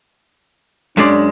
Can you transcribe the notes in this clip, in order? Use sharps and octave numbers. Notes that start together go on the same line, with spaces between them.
F#2 G#3 D4 D5